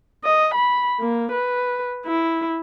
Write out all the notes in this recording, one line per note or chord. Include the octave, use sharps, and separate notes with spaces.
D#5
B5
A#3
B4
E4